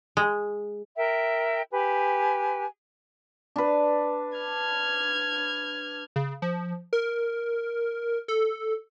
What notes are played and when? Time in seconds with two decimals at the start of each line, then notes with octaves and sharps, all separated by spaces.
0.17 G#3
0.97 A#4 E5 G5
1.71 G4 B4 G#5
3.56 D4 B4
4.38 F6 G#6
6.16 C#3
6.42 F3
6.93 A#4
8.28 A4